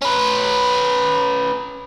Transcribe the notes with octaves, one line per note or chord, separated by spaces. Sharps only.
C#4 B4